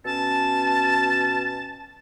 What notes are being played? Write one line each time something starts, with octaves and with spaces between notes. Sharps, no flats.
B2 C#4 A5